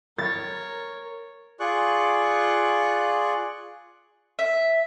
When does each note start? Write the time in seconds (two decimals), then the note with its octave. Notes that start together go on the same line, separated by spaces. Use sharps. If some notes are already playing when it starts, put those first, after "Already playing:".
0.18 A#4 C#5 A6
1.60 F4 G#4 D5 C#6 F#6
4.39 E5